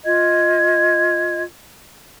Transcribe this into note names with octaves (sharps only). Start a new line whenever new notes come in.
F4 D#5 G#6